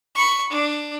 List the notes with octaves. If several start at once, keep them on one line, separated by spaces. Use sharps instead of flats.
B5 C#6
D4